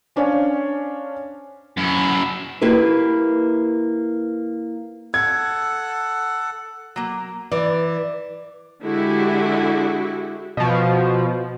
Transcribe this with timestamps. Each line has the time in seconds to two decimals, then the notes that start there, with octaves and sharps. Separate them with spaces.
0.16 C#4 D4 C5 C#5 F5 G#5
1.77 F#2 E4
2.61 A#3 E4 G4 B4
5.14 A4 F#5 G#6
6.96 F#3 A#3
7.52 E3 D5
8.83 D3 G#3 E4 F#4 G4
10.57 B2 F3